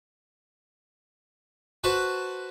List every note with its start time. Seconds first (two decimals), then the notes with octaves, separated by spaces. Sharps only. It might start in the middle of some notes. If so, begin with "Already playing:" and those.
1.84 F#4 B4 C5 A5